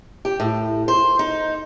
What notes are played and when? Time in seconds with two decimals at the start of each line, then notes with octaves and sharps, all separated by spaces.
0.25 G4
0.40 A2
0.88 C5
1.19 D#4